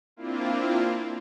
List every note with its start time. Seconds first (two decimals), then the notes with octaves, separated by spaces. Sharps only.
0.16 A#3 C4 D4 E4 F4